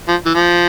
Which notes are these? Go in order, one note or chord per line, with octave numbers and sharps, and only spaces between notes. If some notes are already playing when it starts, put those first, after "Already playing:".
F3
E3
F3